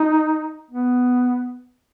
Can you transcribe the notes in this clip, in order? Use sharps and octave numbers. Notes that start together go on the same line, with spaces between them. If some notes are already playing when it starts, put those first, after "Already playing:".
Already playing: D#4
B3